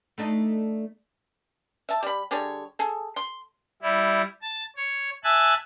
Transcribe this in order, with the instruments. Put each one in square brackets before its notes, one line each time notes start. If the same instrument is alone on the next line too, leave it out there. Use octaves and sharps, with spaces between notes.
[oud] A3 D4 D#4
[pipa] E5 A5
G3 B5
D3 G3 G#4 C#5
G#4 A4
C6
[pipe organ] G3 E4
A5
C#5
E5 G#5 A5 E6 F#6